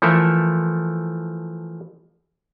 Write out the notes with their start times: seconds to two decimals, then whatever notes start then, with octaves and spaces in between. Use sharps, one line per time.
0.02 E3 F3 A3 A4 A#4 E5